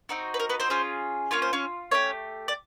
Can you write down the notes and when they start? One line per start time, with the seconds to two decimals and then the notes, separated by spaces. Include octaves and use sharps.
0.09 C4 D#4 F#4
0.34 B4
0.39 A#4
0.49 B3 B4
0.60 C4 C5
0.70 C#4 F4 G#4
1.31 A#3 C#4 F4 C#5
1.42 C5
1.53 C#4 C#5
1.91 A3 C#4 G4 C#5
2.48 D5